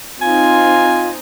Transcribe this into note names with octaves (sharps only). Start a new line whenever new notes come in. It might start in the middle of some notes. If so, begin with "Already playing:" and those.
C4 D#4 F4 G#5